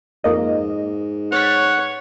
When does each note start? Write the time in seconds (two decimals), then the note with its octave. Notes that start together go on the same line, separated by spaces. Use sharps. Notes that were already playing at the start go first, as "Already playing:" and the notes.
0.24 F2 G#2 A#3 D#5
1.32 C#5 F#5 F6 A6 B6